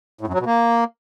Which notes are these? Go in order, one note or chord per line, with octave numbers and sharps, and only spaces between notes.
A2
F#2
F#3
B2
A#3